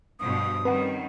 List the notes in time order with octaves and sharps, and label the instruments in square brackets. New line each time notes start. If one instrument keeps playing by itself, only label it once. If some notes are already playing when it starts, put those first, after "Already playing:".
[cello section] G2 B2 F3 [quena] D#6
[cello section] D#3 G3 C#4 [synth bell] C4 F#5 [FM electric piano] B4